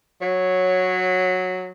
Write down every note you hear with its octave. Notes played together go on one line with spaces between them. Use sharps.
F#3 C#5